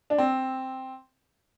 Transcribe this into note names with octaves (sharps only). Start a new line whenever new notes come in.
D4
C4